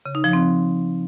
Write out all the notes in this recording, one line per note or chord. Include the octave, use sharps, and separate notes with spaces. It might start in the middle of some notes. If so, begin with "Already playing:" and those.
C#3
D#4
F3
C4